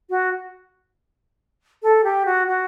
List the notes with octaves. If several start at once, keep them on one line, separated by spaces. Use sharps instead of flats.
F#4
A4
G4
F#4
F#4